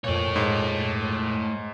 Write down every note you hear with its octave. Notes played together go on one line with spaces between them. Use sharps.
F2 A#2 A3 C#5
G#2